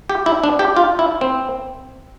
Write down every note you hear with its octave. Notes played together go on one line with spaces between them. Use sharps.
G4
E4
D4
G4
F4
E4
C4